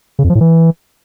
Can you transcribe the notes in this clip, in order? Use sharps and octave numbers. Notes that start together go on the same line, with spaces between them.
C#3
F2
F3
A2
E3